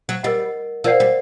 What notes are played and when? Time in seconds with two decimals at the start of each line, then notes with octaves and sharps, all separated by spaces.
0.09 F#3
0.23 G3 A#4 D#5 F#5
0.84 F3 A#4 D5 F#5
1.00 G3